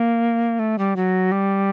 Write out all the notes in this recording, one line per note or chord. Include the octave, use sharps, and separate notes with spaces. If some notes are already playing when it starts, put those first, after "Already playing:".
Already playing: A#3
A3
G3
F#3
G3